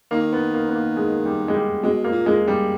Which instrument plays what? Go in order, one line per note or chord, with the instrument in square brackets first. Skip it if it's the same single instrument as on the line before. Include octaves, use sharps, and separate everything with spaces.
[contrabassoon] D#3 [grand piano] A#3
[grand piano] B3
A#3
B3
A#3
G#3
G3
G#3
G3
[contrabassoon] B2 [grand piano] G#3
[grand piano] A#3
[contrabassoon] A#2
[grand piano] G#3
G3